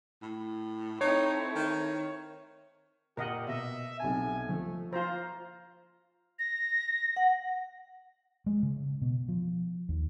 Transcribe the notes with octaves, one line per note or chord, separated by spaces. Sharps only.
A2
A3 C4 D#4 E4 C#5
D#3
A#2 G4 A#4 D#5 F#5
B2 D#5 E5
B1 C3 G#5 A5
F3 A3
F4 C5 A#5
A#6
F#5
G#3
C#3
B2
F3
D#2